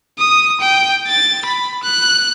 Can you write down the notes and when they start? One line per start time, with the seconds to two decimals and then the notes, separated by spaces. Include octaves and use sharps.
0.19 D#6
0.61 G5
1.07 A6
1.45 B5
1.83 F#6